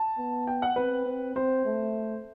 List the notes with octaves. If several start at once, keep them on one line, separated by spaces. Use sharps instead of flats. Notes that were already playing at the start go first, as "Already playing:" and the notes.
Already playing: A5
B3
G5
F#5
C4 B4
C4
C4 C5
A3